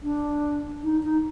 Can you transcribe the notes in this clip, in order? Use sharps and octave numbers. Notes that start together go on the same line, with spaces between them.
D4
D#4
D#4